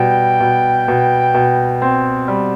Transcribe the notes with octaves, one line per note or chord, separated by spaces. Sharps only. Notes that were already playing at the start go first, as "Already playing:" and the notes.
Already playing: B2 G3 G5
B2
B2
B2
C4
G3